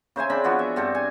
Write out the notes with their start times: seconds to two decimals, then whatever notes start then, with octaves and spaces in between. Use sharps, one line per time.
0.16 C#3 C5 E5 G#5
0.30 C4 D4 B5
0.44 F3 B3 F#4
0.59 E5
0.76 G2 C4 A4
0.95 G#5